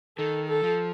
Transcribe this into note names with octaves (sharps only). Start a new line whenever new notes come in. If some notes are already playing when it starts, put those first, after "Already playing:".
D#3 A4
A4
F3